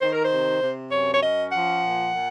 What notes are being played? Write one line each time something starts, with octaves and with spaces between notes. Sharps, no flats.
D#3 C5
A#4
C5
C3
C3
F#2 C#5
C#5
C#4 D#5
F3 F#5
A#2
A#2